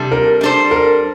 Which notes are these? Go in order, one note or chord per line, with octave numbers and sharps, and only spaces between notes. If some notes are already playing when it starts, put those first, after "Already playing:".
Already playing: C3 G3 D4 A4
A#4
G3 D4 A4 C5
A#4